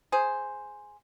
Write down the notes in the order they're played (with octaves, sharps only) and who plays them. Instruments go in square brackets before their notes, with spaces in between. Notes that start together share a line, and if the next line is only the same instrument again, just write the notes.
[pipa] G#4 C5